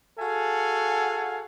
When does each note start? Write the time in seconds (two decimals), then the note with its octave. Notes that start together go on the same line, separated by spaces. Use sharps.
0.19 F#4 G#4 A4 F5 F#5 G#5